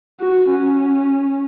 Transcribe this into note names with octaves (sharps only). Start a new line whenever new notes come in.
F#4
C#4